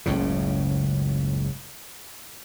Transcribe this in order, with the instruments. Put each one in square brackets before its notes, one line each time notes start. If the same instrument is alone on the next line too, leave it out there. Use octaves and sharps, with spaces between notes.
[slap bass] F#1 C#2 A2 C#3